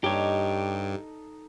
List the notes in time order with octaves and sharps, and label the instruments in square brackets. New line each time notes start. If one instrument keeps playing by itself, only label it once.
[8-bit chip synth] G2 [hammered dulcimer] D#4 A4 D#5 [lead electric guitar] G4 C#5